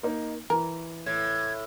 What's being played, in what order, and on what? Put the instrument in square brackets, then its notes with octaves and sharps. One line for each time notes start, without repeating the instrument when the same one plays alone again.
[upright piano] A#3 D#4
[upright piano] E3 [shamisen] A#4
[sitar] A2 [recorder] G#6